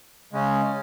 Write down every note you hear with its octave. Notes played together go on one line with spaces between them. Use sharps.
C#3 G#3 C#4